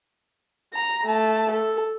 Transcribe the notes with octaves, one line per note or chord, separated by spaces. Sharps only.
A#5
A3 A5
A4